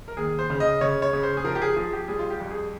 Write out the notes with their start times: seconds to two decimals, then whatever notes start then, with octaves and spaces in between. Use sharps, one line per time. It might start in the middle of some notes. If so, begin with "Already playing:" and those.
0.08 A#4
0.17 D#2 G#4
0.39 C5
0.50 C#3
0.60 D#5
0.81 C#3 C#5
1.02 C#5
1.13 C#3
1.23 C5
1.37 G#4
1.44 F3 A#4
1.55 G4
1.62 G#4
1.76 F3 G#4
1.93 G4
2.08 G3 G#4
2.19 F4
2.30 G4
2.40 F2
2.51 G#4